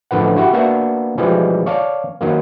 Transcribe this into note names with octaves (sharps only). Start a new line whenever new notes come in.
A1 D3 F3 B4 F#5
E4 F#4 G4 F#5
A#3 B3 D4 F#4 E5
B2 E3 F3 G3 G#3
C#5 D5 F5 A5
D#3 F#3 A#3